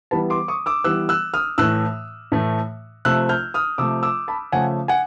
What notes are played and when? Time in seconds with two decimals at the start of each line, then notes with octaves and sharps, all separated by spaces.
0.11 E3 G3 B3 A5 B5
0.30 C6 D6
0.48 C#6 D#6
0.66 D6 E6
0.84 E3 G3 B3 E6 F#6
1.09 E6 F#6
1.34 D#6 F6
1.58 A2 E3 A3 E6 F#6
2.32 A2 E3 A3
3.05 C3 F3 A3 E6 F#6
3.29 F6 G6
3.54 D#6 F6
3.78 C3 F3 A3 D6 E6
4.03 D6 E6
4.28 A5 B5
4.52 C#3 F3 A3 F#5 G#5
4.88 F#5 G#5